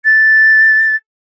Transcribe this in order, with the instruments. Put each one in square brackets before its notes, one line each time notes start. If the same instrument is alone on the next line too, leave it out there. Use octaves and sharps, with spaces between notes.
[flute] A6